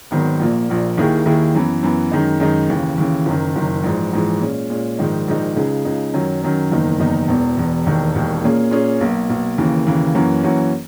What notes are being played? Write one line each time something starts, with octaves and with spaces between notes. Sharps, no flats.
G#1 G#2 D#3 F#3 B3
A#1 A#2 A#3
A#1 A#2 A#3
D#2 D#3 A#3 E4 G#4
D#2 D#3 A#3 E4 G#4
F#2 E3 B3
F#2 E3 B3
F#2 D#3 G#3 D#4
F#2 D#3 G#3 D#4
D#2 C#3 E3
D#2 C#3 E3
F#1 F#2 D#3
F#1 F#2 D#3
A#1 G#2 E3 G#3
A#1 G#2 E3 G#3
A#2 G#3 C#4
A#2 G#3 C#4
A#1 G#2 D#3 G#3 D#4
A#1 G#2 D#3 G#3 D#4
C#2 C#3 G#3 D#4 G#4
C#2 C#3 G#3 D#4 G#4
F#2 D#3 F#3 C#4
F#2 D#3 F#3 C#4
F#1 E2 D#3 A#3 D#4
F#1 E2 D#3 A#3 D#4
E1 E2 B2
E1 E2 B2
E1 D#2 D#3
E1 D#2 D#3
A#2 A#3 C#4 G#4
A#2 A#3 C#4 G#4
B1 B2 A#3
B1 B2 A#3
D#2 C#3 E3 A#3
D#2 C#3 E3 A#3
F#2 E3 A#3 C#4 F#4
F#2 E3 A#3 C#4 F#4